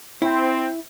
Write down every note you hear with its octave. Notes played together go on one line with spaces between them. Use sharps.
C4 E4